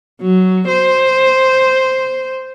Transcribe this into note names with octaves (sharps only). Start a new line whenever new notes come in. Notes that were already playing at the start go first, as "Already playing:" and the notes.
F#3
C5